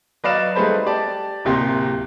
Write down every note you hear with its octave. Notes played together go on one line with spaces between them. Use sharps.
F#3 B4 D5 D#5 F5 E7
G3 A3 D#4 G#4 B4 C5
G4 D5 A5
D1 C3 A#3 G4 C6